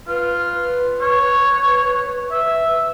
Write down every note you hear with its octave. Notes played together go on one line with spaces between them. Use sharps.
F4 B4
C#5
E5